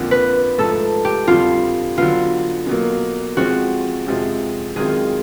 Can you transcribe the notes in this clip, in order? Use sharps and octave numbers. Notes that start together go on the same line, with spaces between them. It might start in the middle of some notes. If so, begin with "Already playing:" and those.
Already playing: F2 D3 F3 A#3
B4
G#2 F3 A3 A4
G4
F2 D3 G3 F4
D3 F#3 B3 F4
B2 F#3 A#3
F3 G#3 C4 F#4
F2 C3 F3 G#3 C4
F#2 D#3 G#3 C4 F4 G#4